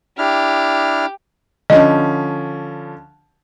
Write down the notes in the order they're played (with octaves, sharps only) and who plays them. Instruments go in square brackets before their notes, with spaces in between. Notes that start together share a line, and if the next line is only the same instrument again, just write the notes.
[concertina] D4 E4 F6 [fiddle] G4
[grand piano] D3 F3 C#4 [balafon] D#5